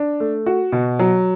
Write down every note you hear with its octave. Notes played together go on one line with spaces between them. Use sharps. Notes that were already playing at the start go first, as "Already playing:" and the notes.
Already playing: D4
A3
F#4
B2
F#3